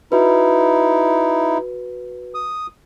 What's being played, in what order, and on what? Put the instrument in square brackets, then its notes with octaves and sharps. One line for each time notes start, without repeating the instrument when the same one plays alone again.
[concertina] D#4 E4 [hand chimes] F#4 B4
[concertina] D#6